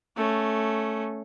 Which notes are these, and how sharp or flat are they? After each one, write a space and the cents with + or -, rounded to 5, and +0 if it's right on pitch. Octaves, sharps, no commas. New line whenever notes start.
A3 +0 C#4 +0